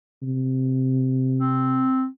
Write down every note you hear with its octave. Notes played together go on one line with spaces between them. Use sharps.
C3
C4